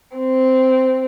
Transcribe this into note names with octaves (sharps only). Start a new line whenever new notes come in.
C4